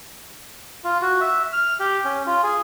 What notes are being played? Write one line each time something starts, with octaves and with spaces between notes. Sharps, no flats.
F4
F#4
E5
F6
G4
C#4
F4
G#4